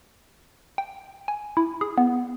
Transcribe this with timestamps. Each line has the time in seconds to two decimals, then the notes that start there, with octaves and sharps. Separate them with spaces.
0.78 G5
1.28 G#5
1.57 E4
1.81 G#4
1.98 B3